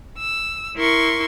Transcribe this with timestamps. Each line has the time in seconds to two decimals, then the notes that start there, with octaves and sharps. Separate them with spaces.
0.18 E6
0.77 E4 A#4 C6 C#6